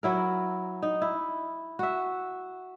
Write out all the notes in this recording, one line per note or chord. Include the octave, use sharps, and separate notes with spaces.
F#3 E4 A#4
D#4
E4
F#4 E5